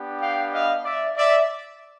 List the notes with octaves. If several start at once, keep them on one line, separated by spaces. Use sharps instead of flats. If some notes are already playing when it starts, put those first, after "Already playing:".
Already playing: B3 D4 G4
F5 G5
D#5 F5
D5 E5
D5 E5